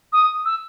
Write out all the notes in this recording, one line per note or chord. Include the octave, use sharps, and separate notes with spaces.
D#6
E6